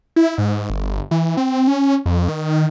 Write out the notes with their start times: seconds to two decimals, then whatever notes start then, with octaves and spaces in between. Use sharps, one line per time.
0.16 E4
0.38 G#2
0.70 G1
1.11 E3
1.37 C4
1.67 C#4
2.06 F2
2.28 D#3